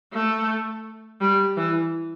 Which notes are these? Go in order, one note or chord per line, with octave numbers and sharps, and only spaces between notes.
A3
G3
E3